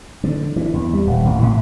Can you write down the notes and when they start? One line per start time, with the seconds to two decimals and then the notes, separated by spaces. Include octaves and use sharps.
0.24 D3
0.56 E3
0.73 E2
0.94 G3
1.07 D#1
1.25 A1
1.42 A2